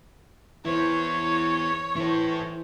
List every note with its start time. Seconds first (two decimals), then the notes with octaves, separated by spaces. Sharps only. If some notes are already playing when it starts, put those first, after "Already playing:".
0.65 E3 B3 E4 C5 C#5
1.96 E3 E4 A4 C5